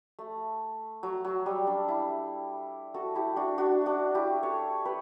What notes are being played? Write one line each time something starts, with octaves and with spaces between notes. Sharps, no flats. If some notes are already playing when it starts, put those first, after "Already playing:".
A3
F#3
F#3
G3
D4
E4
F#4 A4
E4 G4
D4 F#4
D4 F#4
D4 F#4
E4 G4
A4 C#5
G4 B4